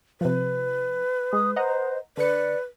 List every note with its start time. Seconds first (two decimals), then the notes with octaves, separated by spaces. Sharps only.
0.21 C3 F3 B4
1.33 G#3 D#6
1.56 C5 D#5 F#5 A#5
2.17 D3 B4 D5 C#7